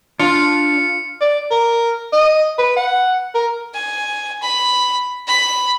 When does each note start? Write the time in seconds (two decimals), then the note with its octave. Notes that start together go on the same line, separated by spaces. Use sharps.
0.20 D4 F4 C#7
1.21 D5
1.51 A#4
2.12 D#5
2.58 B4
2.76 F#5
3.35 A#4
3.74 G#5
4.42 B5
5.27 B5